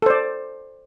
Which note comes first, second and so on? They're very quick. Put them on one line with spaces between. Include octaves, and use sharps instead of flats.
A4 C5 D5